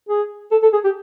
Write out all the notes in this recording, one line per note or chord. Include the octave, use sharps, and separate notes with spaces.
G#4
A4
A4
G#4
G4